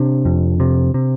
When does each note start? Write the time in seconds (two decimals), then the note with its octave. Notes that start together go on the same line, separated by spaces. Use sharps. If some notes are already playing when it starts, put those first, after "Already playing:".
Already playing: C3 D4
0.25 F2
0.60 C3
0.94 C3